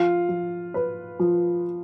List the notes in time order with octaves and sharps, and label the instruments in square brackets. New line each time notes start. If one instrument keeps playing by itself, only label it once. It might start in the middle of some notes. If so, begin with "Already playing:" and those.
Already playing: [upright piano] F3 [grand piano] F4
[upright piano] F3
B4
F3